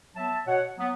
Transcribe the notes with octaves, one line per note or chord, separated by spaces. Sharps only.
F#3 B3 E5 A5
B2 C#5 F#5
F#3 B3